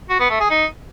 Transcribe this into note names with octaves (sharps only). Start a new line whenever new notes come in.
F#4
B3
A3
G#4
D#4